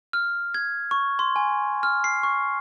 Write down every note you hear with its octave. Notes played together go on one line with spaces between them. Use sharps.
F6
G#6
C#6
C6
G#5
F6
C7
C#6